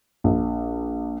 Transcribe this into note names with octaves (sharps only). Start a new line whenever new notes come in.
A#1